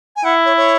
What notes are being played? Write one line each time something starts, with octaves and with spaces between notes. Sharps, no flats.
G#5
E4 F#5
C#5
C#5